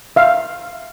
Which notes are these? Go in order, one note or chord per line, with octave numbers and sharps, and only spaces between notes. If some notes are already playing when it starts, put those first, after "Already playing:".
E5 F5